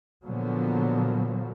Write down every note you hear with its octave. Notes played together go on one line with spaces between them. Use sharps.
A#2 D3 F3 F#3 B3